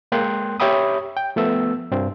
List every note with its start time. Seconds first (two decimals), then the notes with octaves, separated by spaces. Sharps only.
0.12 G#3 A#3 G5 C6 F#6
0.60 G4 C#5 E5 G5 B5 D#6
1.17 G5
1.36 F3 A3 B3 E6
1.92 G2 C4